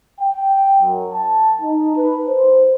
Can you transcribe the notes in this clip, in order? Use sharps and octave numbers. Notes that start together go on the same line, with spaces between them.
G5
F#2
A5
D#4
B4
C5